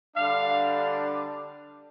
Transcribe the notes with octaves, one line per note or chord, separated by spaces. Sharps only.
D3 G3 D4 F5